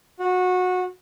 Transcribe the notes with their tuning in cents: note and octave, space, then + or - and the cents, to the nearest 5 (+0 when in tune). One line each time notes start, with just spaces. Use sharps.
F#4 -20